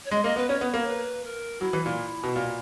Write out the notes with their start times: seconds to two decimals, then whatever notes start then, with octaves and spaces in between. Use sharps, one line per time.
0.05 C#5
0.11 G#3 D#5
0.24 A#3 D#5
0.36 B3 B4
0.49 C#4 C#5
0.61 B3
0.74 A#3
0.86 B4
1.24 A#4
1.60 F#3 E4
1.73 E3
1.86 A#2
2.23 B2
2.36 A#2